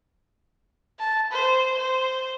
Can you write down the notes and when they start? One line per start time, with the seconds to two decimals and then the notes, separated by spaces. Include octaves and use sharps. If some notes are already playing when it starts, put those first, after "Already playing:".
1.00 A5
1.31 C5
1.78 C5